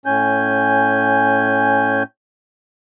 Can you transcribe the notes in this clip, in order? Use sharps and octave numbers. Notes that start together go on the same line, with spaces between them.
A2 C#4 G#5 G6